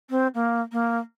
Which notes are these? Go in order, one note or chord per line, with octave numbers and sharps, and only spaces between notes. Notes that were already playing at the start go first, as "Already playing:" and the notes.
C4
A#3
A#3